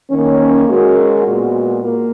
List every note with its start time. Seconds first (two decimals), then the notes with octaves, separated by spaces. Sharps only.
0.11 D#3 A#3 C#4
0.68 G#3 C#4 F#4 A#4
1.26 A#2 G#3 B3 F#4
1.83 A#3